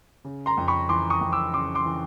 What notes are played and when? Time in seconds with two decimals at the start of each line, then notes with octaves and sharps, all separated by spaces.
0.25 C#3
0.46 A#5 C6
0.57 F2
0.68 B5 C#6
0.89 E3 C6 D6
1.10 C#6 D#6
1.21 F2
1.32 D6 E6
1.53 C#3 C6 D6
1.75 C6 D6
1.85 E3